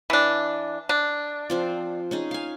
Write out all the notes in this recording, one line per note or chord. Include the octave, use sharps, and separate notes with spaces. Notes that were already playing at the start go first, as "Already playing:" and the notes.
E3 D4
D4
F3 C4 F4
C#4 D#4 G#4
F5 G#5